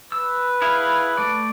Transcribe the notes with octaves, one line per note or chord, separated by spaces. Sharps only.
B4 E6
E4 G#4 F5
A3 D5